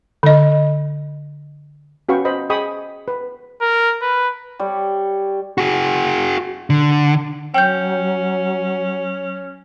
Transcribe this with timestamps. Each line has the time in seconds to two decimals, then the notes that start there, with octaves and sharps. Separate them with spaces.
0.23 D3 D#5
2.09 C#4 F#4 B4 F5 G5 C#6
2.25 C5 D#5 B5
2.50 G#4 D#5 G5 B5 C#6 D#6
3.08 B4
3.61 A#4
4.02 B4
4.59 G3 C#5
5.58 F#4 G#4
6.70 D3
7.54 F#3 C#4 G5 G6